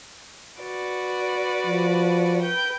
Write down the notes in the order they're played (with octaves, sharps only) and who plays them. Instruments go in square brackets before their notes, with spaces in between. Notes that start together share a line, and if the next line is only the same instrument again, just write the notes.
[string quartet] F#4 B4 D5
[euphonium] F3
[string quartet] B4 G5 G6